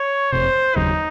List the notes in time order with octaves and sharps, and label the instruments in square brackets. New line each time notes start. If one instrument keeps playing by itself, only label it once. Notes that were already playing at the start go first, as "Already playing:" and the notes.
Already playing: [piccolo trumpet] C#5
[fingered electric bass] F#1 F2 C3 [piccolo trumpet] C5
[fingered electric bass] F1 D#2 C#3 F#3 [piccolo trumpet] D#4